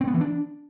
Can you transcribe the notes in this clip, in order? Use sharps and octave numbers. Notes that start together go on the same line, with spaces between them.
C4
B3
E3
D4